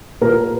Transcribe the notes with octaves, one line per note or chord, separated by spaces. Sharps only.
A#2 A#4